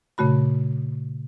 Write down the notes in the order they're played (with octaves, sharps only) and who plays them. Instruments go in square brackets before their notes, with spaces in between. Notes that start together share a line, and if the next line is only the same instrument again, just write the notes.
[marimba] A#2 C#3 A3 F#4 B5